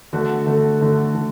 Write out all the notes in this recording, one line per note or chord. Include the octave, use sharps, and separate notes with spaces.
D3 A3 F#4
D3 A3
D3 A3
D3